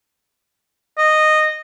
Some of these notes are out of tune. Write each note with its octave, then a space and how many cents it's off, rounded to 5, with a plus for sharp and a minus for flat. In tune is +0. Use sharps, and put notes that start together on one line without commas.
D#5 -10